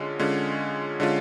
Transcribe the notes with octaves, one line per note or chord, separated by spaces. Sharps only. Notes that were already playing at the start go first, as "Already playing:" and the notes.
Already playing: D3 G#3 C#4 F4
D3 G#3 C#4 F4
D3 G#3 C#4 F4